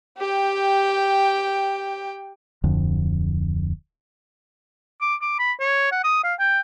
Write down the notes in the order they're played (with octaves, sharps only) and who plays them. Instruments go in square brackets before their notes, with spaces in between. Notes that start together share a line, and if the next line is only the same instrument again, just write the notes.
[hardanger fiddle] G4 G5
[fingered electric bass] D1 F2 D3 F3
[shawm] D6
D6
B5
C#5
F#5
D#6
F5
G5